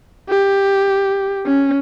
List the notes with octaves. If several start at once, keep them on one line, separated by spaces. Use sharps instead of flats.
G4
C#4